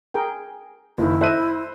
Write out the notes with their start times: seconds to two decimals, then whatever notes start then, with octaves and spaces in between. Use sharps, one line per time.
0.14 G#4 A#4 G5
0.98 F#1 D#3 E4
1.21 A4 C5 D#5 E5 F#6 D#7